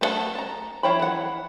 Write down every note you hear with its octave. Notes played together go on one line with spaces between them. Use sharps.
A3 B3 C#5 F#5 A5
A5 A#5
F3 E4 C#5 G5 B5
E3 F#5